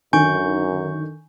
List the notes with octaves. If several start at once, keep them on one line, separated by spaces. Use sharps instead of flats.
F#2 D3 D#3 G#5 C#6 G6